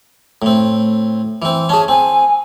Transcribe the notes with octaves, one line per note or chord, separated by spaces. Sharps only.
A2 C4
E3 C4
C#4 G#4 A5
C4 G#5